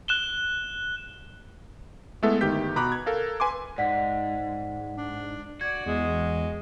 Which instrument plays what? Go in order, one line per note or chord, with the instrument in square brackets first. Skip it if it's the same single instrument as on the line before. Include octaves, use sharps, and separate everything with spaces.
[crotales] F#6 E7 G7
[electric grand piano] G#3 A3 B3 E4 A4 E5
G1 D#3 G4 G6 B6
B2 A#5 B5 D6 F#6
G#6
A4 A#4 F5
B4 G#5 C6 D6
[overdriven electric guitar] G#2 [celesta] D5 F#5 B6
[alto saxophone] D4
[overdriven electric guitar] F#4 [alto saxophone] D5 [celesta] G#6
[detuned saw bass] E2 [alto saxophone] G#3